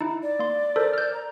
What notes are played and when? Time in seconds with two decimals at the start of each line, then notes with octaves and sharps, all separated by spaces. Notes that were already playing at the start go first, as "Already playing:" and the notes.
0.01 D#4 E4
0.23 D5
0.39 A#3 C6
0.76 A4 A#4 C5
0.93 F6 G6
1.14 A#5